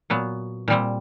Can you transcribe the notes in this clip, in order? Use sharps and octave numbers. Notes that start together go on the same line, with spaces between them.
A#2 F#3 B3
A#2 G3 C4